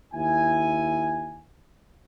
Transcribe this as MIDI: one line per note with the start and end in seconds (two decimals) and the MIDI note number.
0.14 1.45 39
0.14 1.45 64
0.14 1.45 80